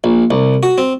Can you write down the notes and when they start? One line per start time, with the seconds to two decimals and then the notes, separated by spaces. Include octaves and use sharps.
0.04 A#1
0.31 C2
0.63 F#4
0.78 C4